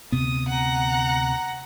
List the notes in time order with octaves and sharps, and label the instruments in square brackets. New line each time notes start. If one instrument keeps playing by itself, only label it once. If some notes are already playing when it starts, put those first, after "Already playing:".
[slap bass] D2 C3 B3 [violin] D#6
[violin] F#5 A#5